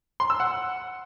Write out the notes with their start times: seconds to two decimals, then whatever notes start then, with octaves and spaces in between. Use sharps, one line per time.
0.20 C6
0.30 E6
0.40 F#5